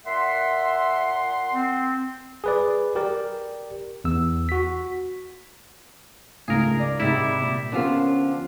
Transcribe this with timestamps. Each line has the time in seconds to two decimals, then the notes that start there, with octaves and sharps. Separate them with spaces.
0.06 A#2 E5 F#5 C6
1.53 C4
2.44 G#4 B4 D5
2.95 G4 A#4 D5
4.04 E2 E6
4.49 F#4 B6
6.48 C#2 G#2 C#3 A3 G#4 A#4
6.80 D5
7.00 G#2 C3 D#3 G3 E4
7.41 A#2
7.72 D3 F3 B3 C#4 F4 G4 A#4